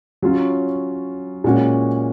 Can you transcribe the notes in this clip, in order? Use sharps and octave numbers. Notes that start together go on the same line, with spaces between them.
F#3 C#4 F4
A#2 G#3 C#4 F#4